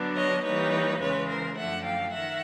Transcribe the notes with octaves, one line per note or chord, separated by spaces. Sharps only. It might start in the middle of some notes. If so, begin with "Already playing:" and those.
Already playing: D3 F#3 B3 D4
C#5 D#5
E3 G3 A#3 D#4 B4 C#5
E2 C#3 E3 G#3 B4 C#5
A#4 C5
F#2 D3 F3 A3 E5 F#5
F5 G5
D#3 E5 F#5